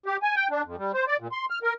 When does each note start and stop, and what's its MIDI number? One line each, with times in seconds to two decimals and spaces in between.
0.06 0.17 67
0.23 0.35 80
0.36 0.47 79
0.50 0.62 62
0.65 0.76 41
0.78 0.92 55
0.94 1.05 72
1.07 1.16 74
1.20 1.28 46
1.32 1.45 84
1.50 1.59 89
1.63 1.74 70